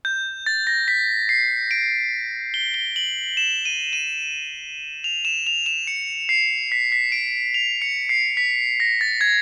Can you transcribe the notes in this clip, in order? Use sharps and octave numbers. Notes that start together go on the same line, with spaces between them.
G6
A6
A#6
B6
C7
D7
G7
G7
F#7
E7
D#7
D#7
F7
E7
F7
E7
C#7
C7
B6
B6
D7
F7
C#7
C7
B6
A#6
A6
G#6